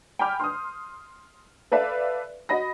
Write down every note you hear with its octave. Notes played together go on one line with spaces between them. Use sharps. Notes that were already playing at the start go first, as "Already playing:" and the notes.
G5 G#5 B5 D6 F6 G6
C6 D#6
A4 B4 D5 E5 F5
F#4 D#5 B5 A#6